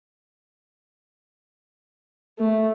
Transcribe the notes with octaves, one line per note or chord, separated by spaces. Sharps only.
A3